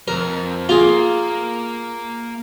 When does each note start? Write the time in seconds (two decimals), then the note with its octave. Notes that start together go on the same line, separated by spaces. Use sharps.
0.08 F2 A#4
0.69 A#3 F4 G#4